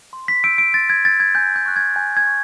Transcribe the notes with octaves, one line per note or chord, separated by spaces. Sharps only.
C6
B6
E6 G6 D7
D7
C6 A6
G#6
E6 G6 A6
G#6
G#5 G6
G6
C#6 F#6
G#6
G#5 G6
G#6
C#6